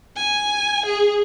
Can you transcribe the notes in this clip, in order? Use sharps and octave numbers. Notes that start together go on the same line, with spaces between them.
G#5
G#4